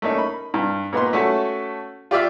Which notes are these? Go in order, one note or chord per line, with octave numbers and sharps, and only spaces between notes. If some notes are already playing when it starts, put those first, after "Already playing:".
A3 A#3 C#4 D#4
B5
G2
A#2 B3 D#4 C6
A3 C#4 F#4 A4
F4 G4 D5 E5 F5